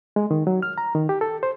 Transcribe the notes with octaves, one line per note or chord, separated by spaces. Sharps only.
G#3
D#3
F#3
F6
A#5
D#3
G4
A4
C5